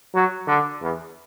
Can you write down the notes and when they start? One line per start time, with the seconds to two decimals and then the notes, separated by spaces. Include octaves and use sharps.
0.14 F#3
0.47 D3
0.81 E2